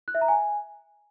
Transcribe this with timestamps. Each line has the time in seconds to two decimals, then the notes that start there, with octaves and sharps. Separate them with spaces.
0.08 F#6
0.15 E5
0.21 A#5
0.28 G#5